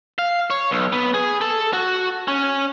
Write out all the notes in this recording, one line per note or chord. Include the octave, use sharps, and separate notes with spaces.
F5
C#5
B1
B3
G#4
A4
F#4
C#4